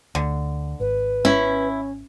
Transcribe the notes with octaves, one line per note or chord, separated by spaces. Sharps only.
D2 D3
G#1 B4
C#4 E4